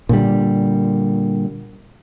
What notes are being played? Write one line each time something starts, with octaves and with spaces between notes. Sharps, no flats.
A#2 D3 G3